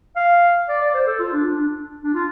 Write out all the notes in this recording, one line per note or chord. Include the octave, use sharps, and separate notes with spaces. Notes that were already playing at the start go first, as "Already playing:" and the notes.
F5
D5
D5
C5
A4
F4
D4
D4
D4
D4
F4